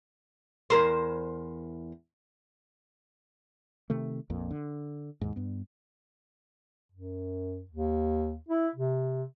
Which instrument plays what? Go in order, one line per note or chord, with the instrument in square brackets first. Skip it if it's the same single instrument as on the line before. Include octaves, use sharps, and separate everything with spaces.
[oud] E2 A#4 C5
[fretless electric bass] C3 D#3 A3
A#1 F2 A#2
D3
D#2 G#2
G2 B3
[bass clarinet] F#2
D#2
E4
C3